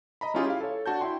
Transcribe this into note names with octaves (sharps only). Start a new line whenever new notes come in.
D#5 A#5 B5
G#3 C#4 E4 F4 G4 G#4
E4 F5
A4 C#5
D4 F#4 A5 G6
E4 G5 C6